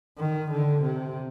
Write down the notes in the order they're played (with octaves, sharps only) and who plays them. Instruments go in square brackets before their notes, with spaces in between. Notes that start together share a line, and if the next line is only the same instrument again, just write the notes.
[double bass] D#3
D3
C3